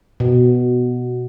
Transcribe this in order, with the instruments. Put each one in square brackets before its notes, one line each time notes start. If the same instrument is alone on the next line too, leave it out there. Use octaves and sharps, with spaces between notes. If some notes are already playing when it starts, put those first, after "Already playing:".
[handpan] B2